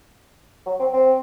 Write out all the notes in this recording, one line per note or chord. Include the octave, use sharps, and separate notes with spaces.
F#3
C4
C4